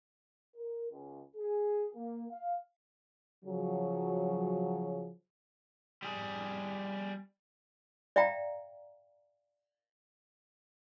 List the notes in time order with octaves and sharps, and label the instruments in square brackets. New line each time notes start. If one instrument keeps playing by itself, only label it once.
[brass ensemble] A#4
C#2
G#4
A#3
F5
[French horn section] C#3 F3 F#3
[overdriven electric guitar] G3 G#4
[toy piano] D5 E5 F5 G5 A#5